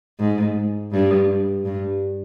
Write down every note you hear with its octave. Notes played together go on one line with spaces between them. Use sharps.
G#2
G2
G2